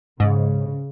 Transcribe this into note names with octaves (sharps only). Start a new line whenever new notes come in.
G#2 C#3